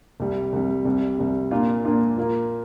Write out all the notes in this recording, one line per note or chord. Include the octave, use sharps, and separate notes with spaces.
C2 C3 G3
C2 C3 G3
C2 C3 G3
C2 C3 G3
A#2 A#3 D4 F4
A#2 A#3 D4 F4
A#2 A#3 F4